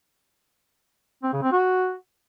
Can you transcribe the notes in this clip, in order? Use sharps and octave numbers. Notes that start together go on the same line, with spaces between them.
C4
C#3
C4
F#4